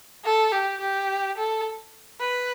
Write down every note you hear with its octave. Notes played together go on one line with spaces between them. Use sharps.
A4
G4
G4
A4
B4